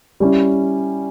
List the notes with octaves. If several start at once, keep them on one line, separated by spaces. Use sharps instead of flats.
G3 C#4 E4